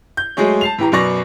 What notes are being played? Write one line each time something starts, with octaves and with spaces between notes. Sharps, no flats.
G6
F#3 G#3 A3 G#4 C#5
A5 C7 F7
A2 E3 G4 A#5
F#2 B2 B4 D5 C#6 A#6